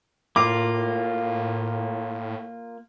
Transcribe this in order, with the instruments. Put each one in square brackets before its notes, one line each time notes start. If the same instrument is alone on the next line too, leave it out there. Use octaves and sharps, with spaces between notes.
[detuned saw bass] A2 [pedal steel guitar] A#3 F4 [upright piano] D6